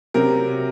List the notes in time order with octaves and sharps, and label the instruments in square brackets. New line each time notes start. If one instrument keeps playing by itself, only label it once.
[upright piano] C3 F#3 C4 A#4